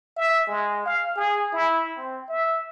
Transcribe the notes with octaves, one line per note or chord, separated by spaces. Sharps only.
E5
G#3
F5
G#4
E4
C4
E5